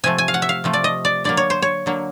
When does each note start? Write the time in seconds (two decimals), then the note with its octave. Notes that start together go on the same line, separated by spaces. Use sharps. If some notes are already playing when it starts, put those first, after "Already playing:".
0.04 C3 F3 A3 G#5
0.18 G#5
0.28 F5
0.34 F#5
0.42 E5
0.49 F5
0.64 C3 F3 A3
0.73 D5
0.84 D#5
1.05 D5
1.24 D3 F#3 A#3 D5
1.37 C#5
1.50 C5
1.62 C#5
1.86 D3 F#3 A#3